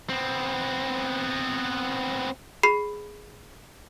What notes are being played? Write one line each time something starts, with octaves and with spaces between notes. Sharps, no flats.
B3 C4
G#4 B5 C7